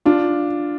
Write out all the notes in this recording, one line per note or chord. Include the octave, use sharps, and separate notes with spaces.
D4 F4